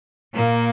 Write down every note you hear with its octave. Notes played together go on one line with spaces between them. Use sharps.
A#2 A#3